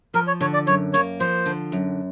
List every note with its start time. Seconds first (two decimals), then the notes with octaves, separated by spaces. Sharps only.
0.14 F3 A#4
0.27 C#5
0.41 D3 C#5
0.54 D5
0.67 F#2 C#5
0.93 A#3 C#5
1.20 F3 C5
1.46 D3
1.72 F#2